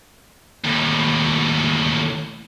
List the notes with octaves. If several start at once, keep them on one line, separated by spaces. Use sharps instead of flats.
D#2 A2